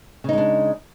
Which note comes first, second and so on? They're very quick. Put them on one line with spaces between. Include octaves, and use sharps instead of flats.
C#3 D#4 G#3 D4